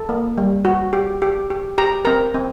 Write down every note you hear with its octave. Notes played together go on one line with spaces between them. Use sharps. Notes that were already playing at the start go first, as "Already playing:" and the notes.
Already playing: A4
A#3
G3
F#4
G4
G4
G4
G4 A#5
C4 A#4 A#5
C4